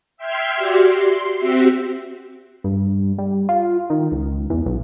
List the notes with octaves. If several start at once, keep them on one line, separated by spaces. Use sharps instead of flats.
E5 G5 C6 F6 G#6
F#4 G4 D5
C6
C4 F#4 G4 E5
G2
G3
F4
D#3
C#2
E2
B1